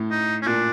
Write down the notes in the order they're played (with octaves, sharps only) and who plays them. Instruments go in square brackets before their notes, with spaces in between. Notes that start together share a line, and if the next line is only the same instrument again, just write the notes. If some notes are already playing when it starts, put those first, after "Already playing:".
Already playing: [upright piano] A2
[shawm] D#4
C#4
[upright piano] A#2 [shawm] D4